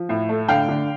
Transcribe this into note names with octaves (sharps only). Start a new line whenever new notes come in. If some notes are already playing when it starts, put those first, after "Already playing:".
Already playing: F3
A2
A3
D3 F5 G5
D3